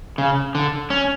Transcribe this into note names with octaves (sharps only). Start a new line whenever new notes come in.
C#3
D3
C#4